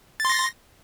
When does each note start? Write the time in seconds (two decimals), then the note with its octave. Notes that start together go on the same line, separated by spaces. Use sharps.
0.20 A6
0.25 C6
0.30 A#6